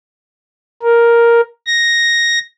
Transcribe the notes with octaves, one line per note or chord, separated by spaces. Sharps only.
A#4
A#6